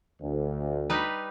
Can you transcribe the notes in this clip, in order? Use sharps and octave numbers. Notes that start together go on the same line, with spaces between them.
D2
G3 D#4 B4